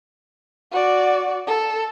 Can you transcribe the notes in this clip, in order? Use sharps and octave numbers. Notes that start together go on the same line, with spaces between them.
F#4 D5
A4